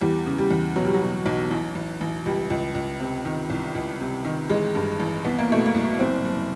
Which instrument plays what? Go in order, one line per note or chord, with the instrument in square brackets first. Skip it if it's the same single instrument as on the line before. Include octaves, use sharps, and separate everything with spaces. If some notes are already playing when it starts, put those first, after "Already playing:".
[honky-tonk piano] E2 G3
C#3
G3
E2
B2 F#3
G3
F#3
B2
B1
A1
A1
A1
C#2 G3
C#2
C#2
C3
D#3
C2
C#2
C3
D#3
A1 G#3
G2
A1
C2 B3
A#3
B2 A3
A#3
C2
F#1 C4
F#1